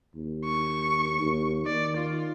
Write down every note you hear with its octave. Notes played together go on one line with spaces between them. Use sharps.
D#2
C#6
D#2
D#3 D5
F4